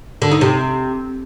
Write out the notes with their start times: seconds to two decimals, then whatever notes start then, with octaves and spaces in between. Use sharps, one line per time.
0.22 D3
0.31 D#4
0.41 C3